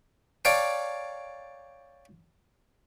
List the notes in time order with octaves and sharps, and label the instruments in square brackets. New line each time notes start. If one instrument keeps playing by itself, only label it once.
[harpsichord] C#5 D5 F5 G5 A5